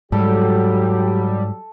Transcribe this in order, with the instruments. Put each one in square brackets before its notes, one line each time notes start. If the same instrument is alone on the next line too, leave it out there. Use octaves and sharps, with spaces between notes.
[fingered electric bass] G#2 [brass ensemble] F#3 G4 [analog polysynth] G3 [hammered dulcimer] A4